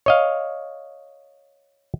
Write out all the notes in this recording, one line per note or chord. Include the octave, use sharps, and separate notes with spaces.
C#5 D#5 F5